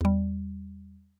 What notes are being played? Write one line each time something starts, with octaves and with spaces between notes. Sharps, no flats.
E2 G3